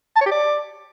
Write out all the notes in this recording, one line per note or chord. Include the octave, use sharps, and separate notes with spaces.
A5
C#5
G4
D5